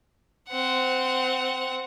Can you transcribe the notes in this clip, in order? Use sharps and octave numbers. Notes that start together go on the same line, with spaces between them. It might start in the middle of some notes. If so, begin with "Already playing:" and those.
C4 F#5